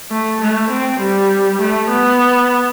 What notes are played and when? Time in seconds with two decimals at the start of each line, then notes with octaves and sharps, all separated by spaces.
0.11 A3
0.42 A3
0.70 C4
1.00 G3
1.61 A3
1.91 B3